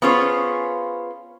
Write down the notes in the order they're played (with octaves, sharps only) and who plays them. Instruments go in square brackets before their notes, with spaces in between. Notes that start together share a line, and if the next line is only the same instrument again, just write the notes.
[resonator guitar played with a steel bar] B3 C#4 F4 G#4 C5